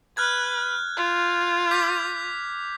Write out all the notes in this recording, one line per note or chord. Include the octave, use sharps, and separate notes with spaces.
B4 F6 F#6 G#6
F4
D6 G6 B6